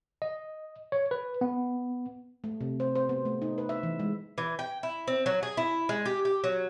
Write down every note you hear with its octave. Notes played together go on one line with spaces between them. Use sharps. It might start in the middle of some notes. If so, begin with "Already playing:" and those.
D#5
C#5
B4
B3
A3
C3
C5
C5
B3
A3
D#4
B4
E5
E3
G#3
E3
G5
E4
C4
F#3
G#4
E4
G#3
G4
G4
F#3